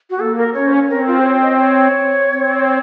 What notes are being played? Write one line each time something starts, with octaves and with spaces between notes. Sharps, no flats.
F#4
A#3 A4
A#4
C#4 C#5
C5
C#5
C4 A#4
F4
C5
C#5
D#5
C#5
C4